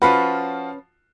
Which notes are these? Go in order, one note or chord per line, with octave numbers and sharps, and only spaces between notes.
F3 C#4 F4 F#4 B4